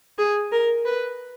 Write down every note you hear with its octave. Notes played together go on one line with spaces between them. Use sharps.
G#4
A#4
B4